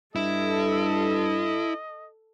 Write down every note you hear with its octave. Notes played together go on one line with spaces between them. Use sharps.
G2 E4 A4 D#5